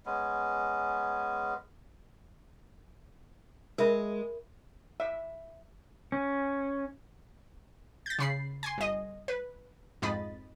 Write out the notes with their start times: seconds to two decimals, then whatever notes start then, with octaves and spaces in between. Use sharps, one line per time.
0.06 G#3 B3 C#4
3.78 G#3 A#4 E5 B5
5.00 E5
6.12 C#4
8.06 G6 A6
8.19 C#3 B5 C7
8.63 G#5 C6
8.78 G1 D#5
9.28 B4
10.02 F2 G#2 D#5 B5 A6